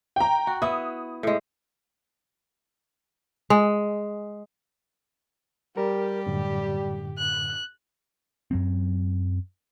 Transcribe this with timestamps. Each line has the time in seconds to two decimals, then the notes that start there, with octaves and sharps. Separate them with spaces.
0.16 G5 A#5
0.47 F#4
0.62 B3 E4 D#6
1.23 A2 G#3
3.50 G#3
5.77 G3 G4 A#4
6.26 F#2 A2 D3
7.18 F#6
8.51 F#2 F#3 C4